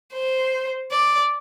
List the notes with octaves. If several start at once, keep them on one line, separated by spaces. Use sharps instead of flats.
C5
D5